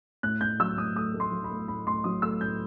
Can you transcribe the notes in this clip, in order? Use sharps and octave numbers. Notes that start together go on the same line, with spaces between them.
A2 F#6
A2 G6
F#3 E6
A2 D#6
A3 D#6
A3
C6
F#3
B5
A3
A2 B5
A2 C6
F#3 D#6
A3 E6
A2 G6